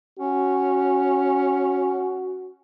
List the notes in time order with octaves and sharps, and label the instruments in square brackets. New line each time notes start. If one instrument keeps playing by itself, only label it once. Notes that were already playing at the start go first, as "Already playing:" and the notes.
[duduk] C#4 [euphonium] F#4